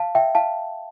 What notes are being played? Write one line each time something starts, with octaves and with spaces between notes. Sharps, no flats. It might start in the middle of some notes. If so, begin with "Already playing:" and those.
Already playing: F5 A5
E5 G5
F5 A5